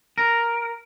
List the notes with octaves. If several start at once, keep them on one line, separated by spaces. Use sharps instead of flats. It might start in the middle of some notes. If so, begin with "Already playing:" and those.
A#4